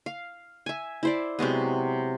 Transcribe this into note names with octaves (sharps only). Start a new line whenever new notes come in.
F5
E5 G#5
E4 C5 D5
C3 F#3 G#3 B3